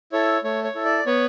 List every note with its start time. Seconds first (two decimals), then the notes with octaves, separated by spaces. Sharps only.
0.12 E4 A4 C#5
0.44 A3 C#5
0.64 C#5
0.75 E4 A4
0.85 D5
1.06 B3 C#5